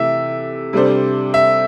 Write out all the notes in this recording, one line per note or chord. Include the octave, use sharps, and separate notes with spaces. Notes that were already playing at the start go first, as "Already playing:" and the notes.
Already playing: C3 E3 A3 E5
C3 G3 D4 A4 C5
E5